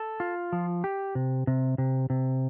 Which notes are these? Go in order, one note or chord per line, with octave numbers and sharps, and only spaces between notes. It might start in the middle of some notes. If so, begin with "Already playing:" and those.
Already playing: A4
F4
F3
G4
C3
C3
C3
C3